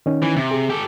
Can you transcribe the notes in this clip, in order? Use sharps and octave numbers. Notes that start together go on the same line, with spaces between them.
D#3 C#4 D#4
E3
C3
G#4
G4 A4